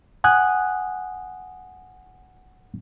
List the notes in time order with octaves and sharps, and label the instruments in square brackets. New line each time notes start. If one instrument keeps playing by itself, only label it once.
[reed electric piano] F#5 G#5 D#6 F#6